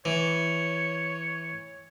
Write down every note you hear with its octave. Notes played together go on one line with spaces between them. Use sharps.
E3 C#5